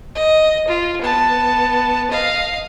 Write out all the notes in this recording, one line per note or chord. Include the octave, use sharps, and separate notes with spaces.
D#5
F4
B3 A5
D#5 F5